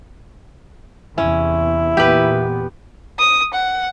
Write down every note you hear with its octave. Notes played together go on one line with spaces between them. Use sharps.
E2 C3 C#4 E4
E2 A#2 B3 G4 B4
D#6
F#5